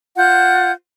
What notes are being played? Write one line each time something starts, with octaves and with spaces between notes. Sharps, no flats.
F4 F#5 G6